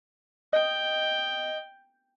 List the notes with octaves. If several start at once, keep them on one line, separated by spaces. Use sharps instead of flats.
D#5 G5